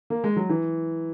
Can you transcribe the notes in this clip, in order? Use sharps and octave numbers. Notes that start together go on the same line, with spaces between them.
A#3
G#3
F#3
E3